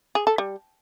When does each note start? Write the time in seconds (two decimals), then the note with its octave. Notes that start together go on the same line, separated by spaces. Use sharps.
0.15 G#4
0.27 A4
0.38 G3